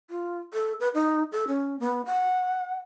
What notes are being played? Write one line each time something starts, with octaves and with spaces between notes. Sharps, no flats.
F4
A4
B4
D#4
A4
C#4
B3
F#5